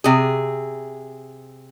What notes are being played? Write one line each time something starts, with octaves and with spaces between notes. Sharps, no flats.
C3 G#4